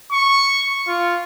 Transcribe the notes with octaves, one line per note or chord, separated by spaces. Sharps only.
C#6
F4